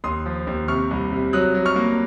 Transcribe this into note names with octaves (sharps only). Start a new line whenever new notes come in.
D#2 C6 D#6
F3
D#2
C3 C#6 F6
C2
C3
F#3 D#6 F#6
F#3
C#6 F6
A#3